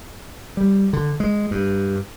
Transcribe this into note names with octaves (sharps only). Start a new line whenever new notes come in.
G3
D3
G#3
G2